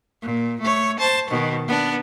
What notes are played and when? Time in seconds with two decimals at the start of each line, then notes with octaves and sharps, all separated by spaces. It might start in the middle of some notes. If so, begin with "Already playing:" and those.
0.23 A#2
0.61 A3 C#5
0.99 C5 A5
1.30 B2 D#3
1.68 B3 D4